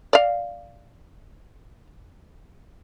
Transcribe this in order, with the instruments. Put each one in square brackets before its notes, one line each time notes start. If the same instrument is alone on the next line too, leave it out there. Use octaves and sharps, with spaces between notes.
[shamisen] D5 F5